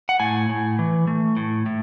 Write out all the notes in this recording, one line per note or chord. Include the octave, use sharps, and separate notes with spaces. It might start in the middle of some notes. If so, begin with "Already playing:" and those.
F#5
A2 G#5
A2
E3
A3
A2
A2